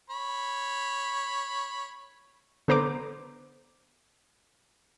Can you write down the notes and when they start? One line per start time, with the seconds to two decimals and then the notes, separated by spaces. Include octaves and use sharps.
0.10 C#5 B5
2.68 D3 B3 C5 A#5 D6